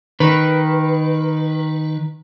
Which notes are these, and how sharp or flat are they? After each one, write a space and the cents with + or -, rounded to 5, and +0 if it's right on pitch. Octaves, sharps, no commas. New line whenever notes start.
D#3 +0 B4 +0